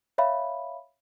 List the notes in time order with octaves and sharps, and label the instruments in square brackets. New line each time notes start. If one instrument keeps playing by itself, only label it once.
[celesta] C#5 E5 F5 B5